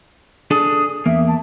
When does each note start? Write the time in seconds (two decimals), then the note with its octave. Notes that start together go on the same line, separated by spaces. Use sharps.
0.51 D4 G#4 A4 D#6
1.06 E2 A#3 E5
1.27 A5